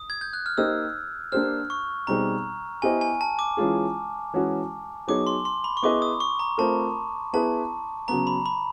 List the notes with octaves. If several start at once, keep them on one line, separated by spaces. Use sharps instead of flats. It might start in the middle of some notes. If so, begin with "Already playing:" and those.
Already playing: D#6
G#6
G6
F#6
F6
A#3 D#4 G4 C5 D#5 E6
A#3 D4 G4 C5 F6
C#6
B2 G3 C4 D#4 G#4 A#5
B3 E4 G4 C5 D#5 G#5
G#5
A5
D6
E3 G#3 C#4 F4 G#4
E3 G#3 C#4 F#4
F#3 B3 D#4 G#4 C#5 D6
C6
C6
B5
C#6
B3 E4 G#4 B4 D#5 D6
D#6
C#6
A#5
A3 C4 F4 A#4 A5
B3 E4 G#4 B4 A5
C#3 F#3 B3 A#5
B5
B5